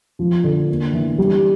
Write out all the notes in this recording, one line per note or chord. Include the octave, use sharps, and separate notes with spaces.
F3
D3
A#3
E3
G3